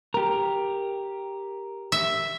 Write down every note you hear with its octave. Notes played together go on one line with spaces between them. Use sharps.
G4 A#4
E5